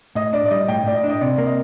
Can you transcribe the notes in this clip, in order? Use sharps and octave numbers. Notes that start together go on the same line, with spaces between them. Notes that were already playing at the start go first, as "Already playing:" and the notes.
A2 D#5
D4 D5
D5
G3 D#5
A2 G5
A2 D5
D#5
D4
D#5
C3 D5
A#3 D5
D#5